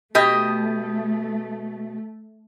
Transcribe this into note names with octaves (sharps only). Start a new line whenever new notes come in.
B2 A3 G4 D#5